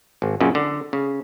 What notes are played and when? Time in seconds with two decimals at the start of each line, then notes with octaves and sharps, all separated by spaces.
0.22 G#1
0.40 F#2 A#2 C#3
0.55 D3
0.93 C#3